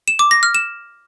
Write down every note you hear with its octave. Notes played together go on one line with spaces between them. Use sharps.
E7
D6
A#6
F6
E7